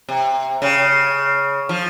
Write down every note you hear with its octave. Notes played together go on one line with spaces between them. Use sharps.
C3
C#3
F3